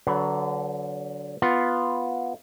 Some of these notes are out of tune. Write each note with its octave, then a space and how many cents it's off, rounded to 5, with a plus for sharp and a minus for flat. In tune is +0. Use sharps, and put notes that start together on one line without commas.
D3 -20 F#3 +15 B4 +0
B3 -5 F4 +0